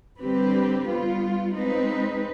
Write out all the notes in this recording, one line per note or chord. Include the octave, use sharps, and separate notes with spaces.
D3 G3 C4 G4 B4
G3 B3 F4
G#3 C4 D#4 B4